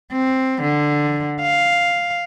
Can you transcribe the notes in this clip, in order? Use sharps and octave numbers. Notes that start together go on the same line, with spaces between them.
C4
D3
F5